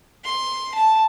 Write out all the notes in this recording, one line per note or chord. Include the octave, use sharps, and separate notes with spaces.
C6
A5